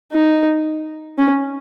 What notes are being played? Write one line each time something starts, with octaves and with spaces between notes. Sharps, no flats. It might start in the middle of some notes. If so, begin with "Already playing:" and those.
D#4
C#4